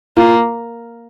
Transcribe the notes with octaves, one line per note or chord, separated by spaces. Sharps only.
A#3 F4